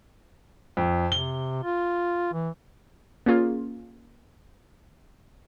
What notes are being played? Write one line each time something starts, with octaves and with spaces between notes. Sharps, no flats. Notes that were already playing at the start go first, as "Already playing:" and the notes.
F2
C3 G7
F4
E3
A#3 C#4 F4 G#4